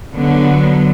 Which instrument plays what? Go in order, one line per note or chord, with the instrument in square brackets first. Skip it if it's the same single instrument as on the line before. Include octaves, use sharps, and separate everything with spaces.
[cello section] D3 F#3 B3